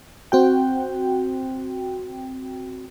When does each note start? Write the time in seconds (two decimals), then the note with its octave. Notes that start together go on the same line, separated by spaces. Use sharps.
0.32 C4 F#4 G5